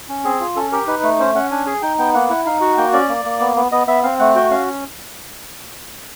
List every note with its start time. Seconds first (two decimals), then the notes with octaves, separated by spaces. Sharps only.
0.09 C#4
0.24 C4 G#4
0.40 F4
0.56 C#4 A4
0.72 G4 A#4
0.87 D#4 B4
1.03 A3
1.19 C#4 C5
1.35 C#4 F#5
1.51 D4 G#5
1.66 G#4 G#5
1.82 D#4 G5
1.99 B3 G5
2.14 A#3 F#5
2.30 E4 F#5
2.46 D#4 F5
2.61 F#4 F#5
2.77 A#3 G5
2.93 C#4 D5
3.09 A#3
3.25 A#3
3.40 B3
3.56 B3
3.72 B3 D#5
3.87 B3 E5
4.03 C4 F5
4.19 A3 F#5
4.35 F#4 G5
4.50 C#4 F5